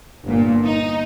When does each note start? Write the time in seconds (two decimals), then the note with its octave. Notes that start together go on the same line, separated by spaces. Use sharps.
0.24 G1 A#2
0.65 D#4